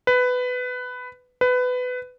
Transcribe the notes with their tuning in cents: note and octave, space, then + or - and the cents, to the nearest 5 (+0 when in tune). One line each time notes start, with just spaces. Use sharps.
B4 +15
B4 +20